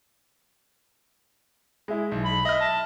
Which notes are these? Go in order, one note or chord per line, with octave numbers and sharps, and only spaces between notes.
G#3 E4
B1
B5
D#5 E5 F6
A5